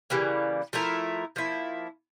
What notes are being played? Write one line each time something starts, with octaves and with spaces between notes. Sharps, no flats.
C#3 E3 G3 A#3
F3 A3 E4 A#4
F3 A#3 E4